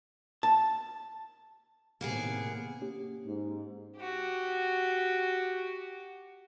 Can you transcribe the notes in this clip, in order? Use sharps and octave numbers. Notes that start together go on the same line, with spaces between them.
A5
A2 C3 D#3 A#3 B3 G#4
A#3 C#4 G4
G#2
F#4 G4